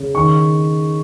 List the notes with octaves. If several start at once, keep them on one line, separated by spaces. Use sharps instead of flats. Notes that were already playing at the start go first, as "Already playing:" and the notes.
Already playing: C#3
D#3 C#6